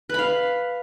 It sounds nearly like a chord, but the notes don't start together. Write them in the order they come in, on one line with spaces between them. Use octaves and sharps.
B4 B5 F5